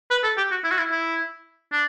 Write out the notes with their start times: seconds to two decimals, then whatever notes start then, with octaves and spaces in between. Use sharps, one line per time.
0.11 B4
0.24 A4
0.37 G4
0.51 F#4
0.64 E4
0.71 F#4
0.78 E4
0.92 E4
1.72 D4